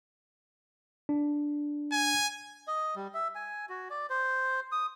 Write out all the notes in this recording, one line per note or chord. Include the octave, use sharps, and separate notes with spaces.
D4
G#5
D#5
G3
E5
G#5
F#4
D5
C5
D#6